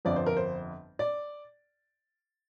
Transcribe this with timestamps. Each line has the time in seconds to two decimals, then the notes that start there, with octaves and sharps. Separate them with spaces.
0.05 G1 F2 D3 F3 D5
0.16 C5
0.26 A#4
0.37 C5
0.99 D5